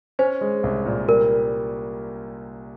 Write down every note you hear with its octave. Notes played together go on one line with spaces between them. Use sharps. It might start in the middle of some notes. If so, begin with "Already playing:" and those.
C#4 C5
G#3
C2
A#2
G3 A#4